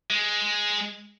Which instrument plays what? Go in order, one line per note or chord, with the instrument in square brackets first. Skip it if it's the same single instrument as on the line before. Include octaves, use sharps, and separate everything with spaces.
[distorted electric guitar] G#3